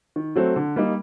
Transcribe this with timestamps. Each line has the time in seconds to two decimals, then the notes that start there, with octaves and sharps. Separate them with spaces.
0.16 D#3
0.36 F#3 A3 C4
0.56 D3
0.76 G3 A#3 D#4